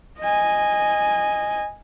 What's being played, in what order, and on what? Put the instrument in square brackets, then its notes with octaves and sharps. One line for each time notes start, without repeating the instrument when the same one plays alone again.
[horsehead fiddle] D#5 G#5